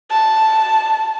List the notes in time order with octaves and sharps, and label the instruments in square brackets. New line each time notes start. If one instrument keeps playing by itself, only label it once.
[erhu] A5